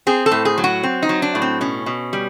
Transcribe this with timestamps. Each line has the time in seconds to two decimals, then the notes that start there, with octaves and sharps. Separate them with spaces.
0.07 C4 G#4
0.26 A4
0.31 A2
0.45 G#4
0.58 F#3
0.64 F#4
0.83 C4
1.03 D#4
1.09 F#3
1.22 D4
1.35 A2
1.42 C4
1.61 B2 C#4
1.86 B2
2.13 G3